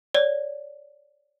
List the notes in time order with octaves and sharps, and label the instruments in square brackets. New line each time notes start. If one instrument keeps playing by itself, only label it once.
[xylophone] C#5 D5